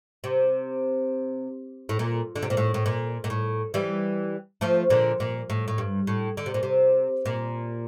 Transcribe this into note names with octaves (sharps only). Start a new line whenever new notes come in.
C3
A2
A#2
D3
C3
A#2
A2
A2
A#2
A#2
A2
E3 G3
F3 A3
A#2 D3
A#2
A2
A2
G2
A2
D3
C3
A#2
C3
A#2